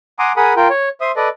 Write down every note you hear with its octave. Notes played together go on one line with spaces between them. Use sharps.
F#5 G#5 A#5 C6 D6 D#6
G#4 A#4 F#5 G#5 B5 D#6
F4 A#4 G5
C#5
C5 E5 C6 D#6
A4 B4 D5 D#5